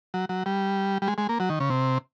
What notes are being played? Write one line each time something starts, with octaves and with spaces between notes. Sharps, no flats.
F#3
F#3
G3
G3
G#3
G#3
A#3
F#3
D#3
C#3
C3